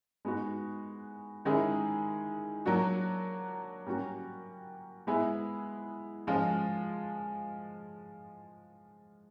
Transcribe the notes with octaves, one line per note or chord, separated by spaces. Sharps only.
G#3 B3 D#4 F#4
D#3 G#3 C#4 E4 G#4
F#3 A#3 D4 F#4
G3 A#3 C#4 F#4
G#3 B3 E4 G#4
F3 G#3 C#4 F4